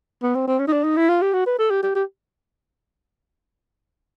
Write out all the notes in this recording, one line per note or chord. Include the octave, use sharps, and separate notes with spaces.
B3
C4
C4
C#4
D#4
D4
D#4
E4
F4
G4
F#4
B4
A4
G4
G4
G4